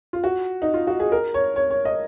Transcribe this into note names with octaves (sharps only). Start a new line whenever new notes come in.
F4
F#4
D#4
F4
F#4
G#4
A#4
C#5
C#5
C#5
D#5